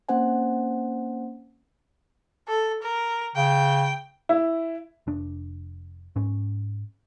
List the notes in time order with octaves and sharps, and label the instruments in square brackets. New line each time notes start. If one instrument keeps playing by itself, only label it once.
[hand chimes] A#3 C4 C#4 C5 F#5 G#5
[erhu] A4
A#4
[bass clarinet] C#3 [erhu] G5
[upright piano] E4
[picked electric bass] F1 D4
G#2 C#4